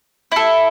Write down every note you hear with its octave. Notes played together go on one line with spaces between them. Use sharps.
E4 A4